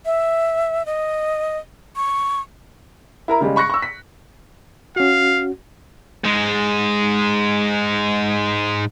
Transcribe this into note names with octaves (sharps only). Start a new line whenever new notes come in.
E5
D#5
C#6
E4 A#4 A#5
C#3 G3 G#3
B5 C#6 F#6 A#6 C#7
C#6 E6
B6
C#4 F#4 F5
G#2 G#3